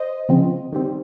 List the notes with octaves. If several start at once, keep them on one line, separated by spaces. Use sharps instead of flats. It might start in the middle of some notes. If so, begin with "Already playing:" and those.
Already playing: C5 D#5
C#3 F3 C4
D#3 G3 C4